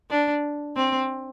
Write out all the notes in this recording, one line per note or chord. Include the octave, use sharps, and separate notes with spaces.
D4
C4